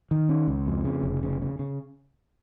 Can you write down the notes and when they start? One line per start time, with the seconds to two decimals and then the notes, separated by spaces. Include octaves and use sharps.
0.11 D#3
0.29 C#4
0.48 C#2
0.67 F2
0.85 C#3
1.03 F1
1.23 C#3
1.42 C#3
1.59 C#3